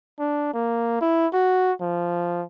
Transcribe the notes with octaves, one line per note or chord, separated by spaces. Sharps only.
D4
A#3
E4
F#4
F3